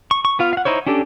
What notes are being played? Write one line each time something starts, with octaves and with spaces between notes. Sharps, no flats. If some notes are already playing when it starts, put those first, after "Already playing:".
C#6
C#6
B3 F4 F5
F5 F#5
D#4 E4 C5 C#5
C#4 D4 G4 A4